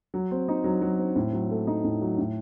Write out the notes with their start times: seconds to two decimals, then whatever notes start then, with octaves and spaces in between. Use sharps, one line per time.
0.14 F#3
0.31 C4
0.48 D#4
0.64 F#3
0.82 F#3
0.99 C4
1.16 A2
1.33 F#3
1.50 A3
1.67 D#4
1.84 A2
2.01 F#3
2.18 A2